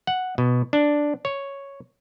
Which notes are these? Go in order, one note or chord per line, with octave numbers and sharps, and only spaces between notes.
F#5
B2
D4
C#5